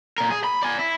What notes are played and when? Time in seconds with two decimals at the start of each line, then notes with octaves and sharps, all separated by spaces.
0.18 A#2 A#4
0.31 G#4
0.44 B5
0.62 D5 G#5
0.79 E4